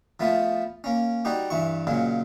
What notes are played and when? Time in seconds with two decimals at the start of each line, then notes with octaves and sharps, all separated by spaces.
0.20 F3 A3 B3 F4
0.84 A#3 C#4
1.25 G3 D#4 F#4 G4
1.50 G2 E3 C#6
1.87 A#2 C#3 F#3 G#3